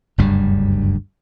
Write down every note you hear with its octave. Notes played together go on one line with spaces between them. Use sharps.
F#1 D2 G2 G3